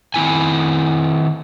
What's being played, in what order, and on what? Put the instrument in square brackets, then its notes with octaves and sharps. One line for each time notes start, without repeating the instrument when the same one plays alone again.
[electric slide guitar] D#3 C4 E4 G#5